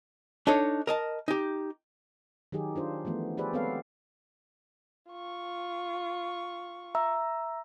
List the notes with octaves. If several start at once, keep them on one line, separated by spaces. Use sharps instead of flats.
D4 D#4 A4 C#5
A#4 D#5 A5
D#4 G4
D#3 F#3 D#4 G4 G#4
D4 F4 C5
E3 F3 A3 B3
G4 G#4 B4 C5 D5 E5
G#3 B3 C4 A4 C#5 F5
F4 C#6
E5 A#5 E6